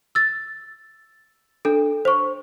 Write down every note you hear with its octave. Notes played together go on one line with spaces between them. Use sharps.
E6 A6
D4 A4
C5 C#6